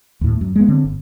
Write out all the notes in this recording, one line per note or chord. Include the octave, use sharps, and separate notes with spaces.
D#2 A2
F#2
G#3 B3
D3 C4
G1